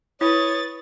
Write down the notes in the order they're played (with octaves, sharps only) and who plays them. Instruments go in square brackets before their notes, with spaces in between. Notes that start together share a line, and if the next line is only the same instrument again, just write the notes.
[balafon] E4 [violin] B4 A6 [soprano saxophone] C#5 [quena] D#6